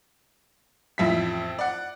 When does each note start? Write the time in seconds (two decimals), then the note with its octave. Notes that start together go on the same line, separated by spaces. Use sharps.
0.98 A1 F2 E4 B6
1.59 D5 F#5